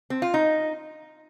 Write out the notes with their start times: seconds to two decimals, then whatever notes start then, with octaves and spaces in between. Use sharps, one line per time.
0.10 C4
0.22 F4
0.34 D#4